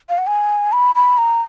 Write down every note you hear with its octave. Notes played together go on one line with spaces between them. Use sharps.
F5
F#5
G#5
B5
B5
A#5